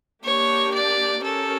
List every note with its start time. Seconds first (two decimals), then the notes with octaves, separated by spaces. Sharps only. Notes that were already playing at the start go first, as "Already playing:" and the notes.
0.24 A#3 D4 G4 C#5
0.74 D5
1.23 C#4 G4 A4 A#4 C#5